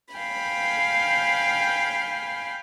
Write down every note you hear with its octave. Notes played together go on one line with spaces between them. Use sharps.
F5 G5 G#5 B5